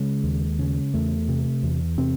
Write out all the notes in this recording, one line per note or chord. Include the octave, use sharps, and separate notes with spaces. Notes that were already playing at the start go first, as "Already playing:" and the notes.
Already playing: C#3 G#3
D#2
C#3
E2 A3
C3
E2
C3 C4